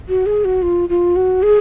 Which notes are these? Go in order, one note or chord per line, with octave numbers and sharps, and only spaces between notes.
F#4
G#4
F#4
F4
F4
F#4
G#4